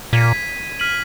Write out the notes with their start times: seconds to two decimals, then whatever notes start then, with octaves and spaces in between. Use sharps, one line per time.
0.13 A#2 G#6 B6 D#7
0.80 F6 B6 D#7 F#7